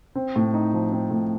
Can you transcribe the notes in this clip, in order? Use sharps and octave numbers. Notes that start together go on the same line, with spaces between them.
C4
A2
D#4
F3
C4
A2